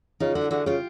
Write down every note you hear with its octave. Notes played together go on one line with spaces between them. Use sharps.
C#3 D#4 F4
D3 E4 F#4
D3 F#4 G#4
C#3 F4 G4